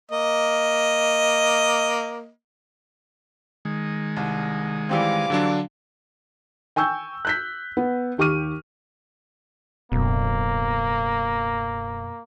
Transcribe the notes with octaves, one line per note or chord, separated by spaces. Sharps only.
A#3 D#5
D#3 G#3
C2
E3 G3 C4 F5 D6
D3 F#3 D4
G5 G#5 C#6 E6 G6
F#6 G6 B6
B3
D#2 G4 C#6 D6 F6 D#7
D1 F#2 B2 A#3